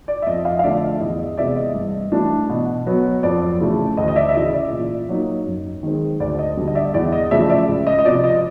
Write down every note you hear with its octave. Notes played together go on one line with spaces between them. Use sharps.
D5
E5
F2 D#5
D#5 F5
F5
D3 F3 A3 D4 D5 E5
E2 D#5
D#5
C3 E3 G#3 B3 D5 E5
D#5
G2
E3 A3 D4
B2
F#3 B3
F2 D5
C#3 E3 A3
D2 D#5
D#5
D5 E5
E5
C#3 E3 D#5
D5
A#2
F#3 A#3 D#4
F#2
D#3 G#3 C4
D2 D5
D#5
D3 G3
D#5
D5 E5
E2 D5
D#5
C#3 F3 A3 D5 E5
D5 E5
C#2
D#5
D#5
C3 F3 D5
D#5